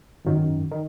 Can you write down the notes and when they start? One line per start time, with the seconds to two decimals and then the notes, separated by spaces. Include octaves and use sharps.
0.25 G#1 F#2 D#3
0.71 D#3